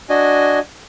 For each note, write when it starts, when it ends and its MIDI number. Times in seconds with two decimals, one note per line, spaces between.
0.09 0.59 62
0.09 0.59 66
0.09 0.59 75
0.09 0.59 80